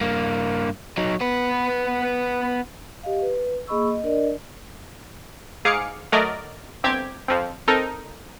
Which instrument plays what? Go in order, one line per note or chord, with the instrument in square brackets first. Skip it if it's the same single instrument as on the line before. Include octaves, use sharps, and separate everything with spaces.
[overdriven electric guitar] G2 A#3
F#3 D#4
B3 B4
[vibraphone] G4 D#5 F5
B4
A#3 G#4 D#5 B5 C#6 E6
D#5
D4 A#4 D5 D#5
[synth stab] G#2 G#4 F5 D6 C#7
F#3 A3 A#4 D5 D#5
G1 C4 G4 G#6
F2 F3 C4
C4 D#4 A4 A#4